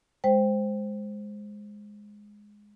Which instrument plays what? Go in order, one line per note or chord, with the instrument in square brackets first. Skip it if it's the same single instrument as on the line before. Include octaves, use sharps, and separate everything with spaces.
[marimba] G#3 C5 G5